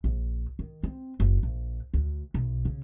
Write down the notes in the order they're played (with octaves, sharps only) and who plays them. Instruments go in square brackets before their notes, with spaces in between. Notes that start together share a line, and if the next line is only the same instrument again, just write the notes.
[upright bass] A#1
D#3
C4
F#1
A#1
D2
B1
C#3